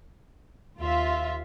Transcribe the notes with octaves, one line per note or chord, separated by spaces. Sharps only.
D#2 F4 E5